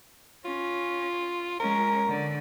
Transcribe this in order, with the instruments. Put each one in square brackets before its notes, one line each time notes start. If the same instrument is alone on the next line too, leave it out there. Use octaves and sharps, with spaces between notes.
[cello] C#4 [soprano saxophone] F4
[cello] G#3 C#4 [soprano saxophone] A#4
[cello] D3